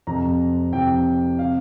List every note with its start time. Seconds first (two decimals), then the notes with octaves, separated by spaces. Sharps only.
0.07 F2 C3 A#5
0.73 F2 C3 G5
1.39 C3 F5